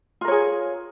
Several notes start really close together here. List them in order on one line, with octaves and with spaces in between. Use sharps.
F4 A#4 C#5 G#4